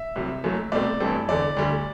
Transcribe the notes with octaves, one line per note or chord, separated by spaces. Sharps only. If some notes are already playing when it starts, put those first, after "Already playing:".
Already playing: E5
C2 C3 F#3
F#1 F#2 F#3 A3
C2 B2 A3 C4 D5
A1 G2 E3 G3 C4 A4
E1 E2 D3 D5
D2 D3 G3